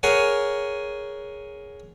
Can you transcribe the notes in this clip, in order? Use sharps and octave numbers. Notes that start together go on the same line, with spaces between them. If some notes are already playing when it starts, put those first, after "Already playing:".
G#4 A#4 C#5 F#5 G#5